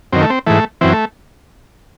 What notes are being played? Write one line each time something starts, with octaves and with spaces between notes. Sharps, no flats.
F#2 D#3 C4
A3
C4
G#2 E3 A3
F#2 E3 C4
A3